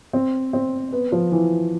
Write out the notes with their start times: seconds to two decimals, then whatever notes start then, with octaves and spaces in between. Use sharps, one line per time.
0.13 C4
0.53 C4
0.93 B3
1.12 F3
1.32 E3